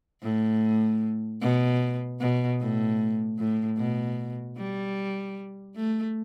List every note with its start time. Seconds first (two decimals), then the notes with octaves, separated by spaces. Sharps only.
0.23 A2
1.41 B2
2.20 B2
2.60 A2
3.38 A2
3.78 B2
4.57 G3
5.76 A3